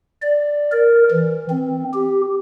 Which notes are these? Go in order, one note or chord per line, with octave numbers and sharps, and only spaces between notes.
D5
A#4
E3
C4
G4